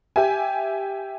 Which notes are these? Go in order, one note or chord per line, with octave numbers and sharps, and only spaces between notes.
G4 E5 G#5